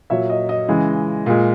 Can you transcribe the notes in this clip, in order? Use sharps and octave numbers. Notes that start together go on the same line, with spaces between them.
A#2 F#3 C#5 E5
D#5
D#5
C#3 E3 G#3
A#2 G#3